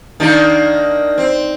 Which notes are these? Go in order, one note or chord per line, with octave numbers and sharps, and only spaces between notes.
D#3 A#3 D4
C4